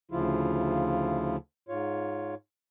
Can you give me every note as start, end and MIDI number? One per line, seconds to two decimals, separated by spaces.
0.11 1.36 38
0.11 1.36 49
0.11 1.36 53
0.11 1.36 64
0.11 1.36 65
1.69 2.35 44
1.69 2.35 65
1.69 2.35 73